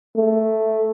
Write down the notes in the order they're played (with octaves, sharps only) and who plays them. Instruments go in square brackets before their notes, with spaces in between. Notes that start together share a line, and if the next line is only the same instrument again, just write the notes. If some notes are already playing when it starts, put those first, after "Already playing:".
[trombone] A3